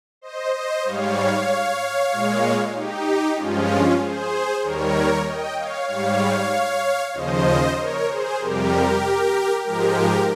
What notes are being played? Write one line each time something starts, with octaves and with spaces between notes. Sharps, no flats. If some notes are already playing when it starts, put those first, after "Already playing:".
C5 D#5
C5 D#5
G#2 G3 C#5 F5
A#2 G#3
D#4 G4
G2 F3 G#3 C#4 F4
G#4 C5
D#2 D#3 G3 A#4 C#5
D#5 G5
C#5 F5
G#2 G3 C#5 F5
D#2 C#3 F3 C5 D#5
A#4 C#5
G#4 C5
F2 C3 G3 G4 A#4
G#2 F3 G#3 G4 A#4